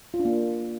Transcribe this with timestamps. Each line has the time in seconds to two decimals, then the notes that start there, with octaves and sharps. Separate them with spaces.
0.14 F4
0.19 D4
0.25 A#3